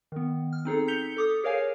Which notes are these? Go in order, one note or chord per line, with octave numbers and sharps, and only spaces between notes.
D#3 B3
F6
C4 D#4 G#4 A4
G6 B6 C#7 F7 G7
A4 D6 D#6
G#4 A#4 C#5 F5 G#5